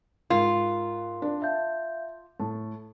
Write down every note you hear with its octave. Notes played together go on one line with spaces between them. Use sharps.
G#2 F4 A#4 C6
D4
E5 F5 A5 G6
A2 A5